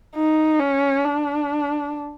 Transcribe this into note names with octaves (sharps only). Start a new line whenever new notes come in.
D#4
C#4
D4